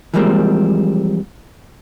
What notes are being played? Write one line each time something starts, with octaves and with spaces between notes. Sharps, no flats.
E3 F3 G3 G#3 A#3 C4